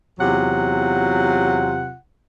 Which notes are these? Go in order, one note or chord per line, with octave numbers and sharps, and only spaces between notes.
E2 C3 F#3 F4 F#5